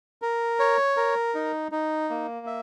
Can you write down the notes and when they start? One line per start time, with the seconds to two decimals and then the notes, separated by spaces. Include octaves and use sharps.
0.22 A#4
0.59 C#5
0.97 A#4
1.35 D#4
1.72 D#4
2.10 A#3
2.47 E5